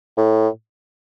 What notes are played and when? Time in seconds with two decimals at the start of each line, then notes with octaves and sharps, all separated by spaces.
0.18 A2